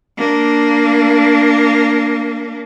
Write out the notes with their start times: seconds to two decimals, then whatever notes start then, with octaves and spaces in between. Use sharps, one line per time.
0.17 A#3 D4